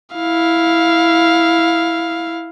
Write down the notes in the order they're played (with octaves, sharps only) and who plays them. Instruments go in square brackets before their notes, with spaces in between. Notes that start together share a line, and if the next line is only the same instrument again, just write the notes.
[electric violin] E4 F5